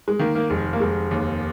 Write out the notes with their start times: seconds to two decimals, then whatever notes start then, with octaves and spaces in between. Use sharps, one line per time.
0.08 G#3
0.19 D#3 A#3
0.35 A#3
0.50 F1 G#3
0.73 A#3
0.80 F1 G#3
1.11 D#2